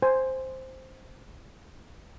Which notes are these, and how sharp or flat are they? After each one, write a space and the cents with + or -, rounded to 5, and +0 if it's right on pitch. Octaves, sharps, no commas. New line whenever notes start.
C5 +0 G#5 -5